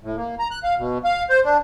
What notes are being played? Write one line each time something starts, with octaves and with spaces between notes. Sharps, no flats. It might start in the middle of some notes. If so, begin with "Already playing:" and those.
A2
A#3
A#5
F#6
F5
B2
F5
C5
D4